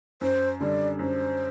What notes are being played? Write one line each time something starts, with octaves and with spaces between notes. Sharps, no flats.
F#2 C5
D3 G3 D5
F#2 C5